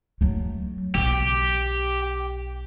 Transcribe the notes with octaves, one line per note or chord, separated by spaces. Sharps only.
F#3 A3
B1 G4